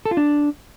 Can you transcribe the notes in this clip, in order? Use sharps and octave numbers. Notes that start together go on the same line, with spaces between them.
A4
F4
D4